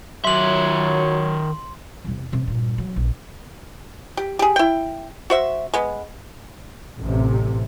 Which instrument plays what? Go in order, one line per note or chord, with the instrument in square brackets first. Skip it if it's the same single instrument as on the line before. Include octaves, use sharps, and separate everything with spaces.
[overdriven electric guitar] D#3 E5 [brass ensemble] F#3 C#5 [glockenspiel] C6 F#7
[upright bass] E2 C3
C3 A3
G2 A#2
F#3
A#1
[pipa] G4
G4 G#4
E4 G5
F#4 C5 E5
G#3 B3
[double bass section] A1 C3